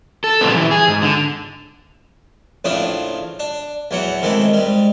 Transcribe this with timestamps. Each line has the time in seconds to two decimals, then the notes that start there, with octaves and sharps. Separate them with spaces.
0.24 A4
0.41 A#2 C#3 F3 G3 B3 C4
0.56 E3
0.71 G#4
0.88 G#2
1.02 D3
2.65 A1 A2 C#3 F3 D4 D#6
3.39 D4
3.91 E2 E3 F#3 F#5
4.22 C3 D#3 E3 G#3 A3
4.53 G#2 G3